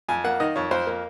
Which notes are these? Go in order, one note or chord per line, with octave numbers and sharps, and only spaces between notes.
F2 G#5
A#3 F#5
D#3 D#5
F2 C#5
F2 C5
A#3